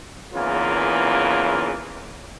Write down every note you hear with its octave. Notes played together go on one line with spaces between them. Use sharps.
G#1 E2 C#3 E3 A#3 F4